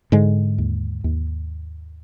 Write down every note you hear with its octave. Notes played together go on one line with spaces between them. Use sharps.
G#2 D3 G#3
D#2
D#2